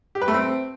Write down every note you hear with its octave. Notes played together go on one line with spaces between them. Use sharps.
G4
B4
A3
C4